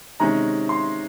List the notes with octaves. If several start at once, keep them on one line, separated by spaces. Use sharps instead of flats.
C3 D#3 G#3 C#4 A#5
C6